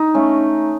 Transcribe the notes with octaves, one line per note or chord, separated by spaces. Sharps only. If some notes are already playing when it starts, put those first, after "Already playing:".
Already playing: D#4
A3 C#4